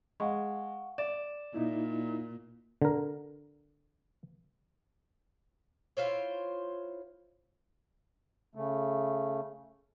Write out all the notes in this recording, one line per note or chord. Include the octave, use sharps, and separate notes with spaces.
G#3 F5 F#5 C#6
D5 E7
A#2 D#4 E4
D3 A#4
E4 F4 C5 C#5
C#3 A3